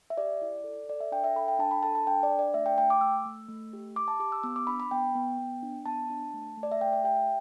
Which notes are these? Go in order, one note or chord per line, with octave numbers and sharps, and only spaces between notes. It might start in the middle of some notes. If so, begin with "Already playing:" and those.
E5
G4 D5
E4
A4
A4 D5
E5
D4 G5
E5
A4 B5
G5
D4 A5
B5
A4 A5
A5
D4 G5
D5
D4
D5
A3 E5
G5
A3 G5
D6
A3 E6
A3
A3
G4
G4 D6
A5
G4 D6
E6
B3 E6
D6
D4 B5
B5
B3 G5
B3
B3
D4
B3 A5
D4
A3
A3
D5
E5
A3 G5
E5
G4 G5
E5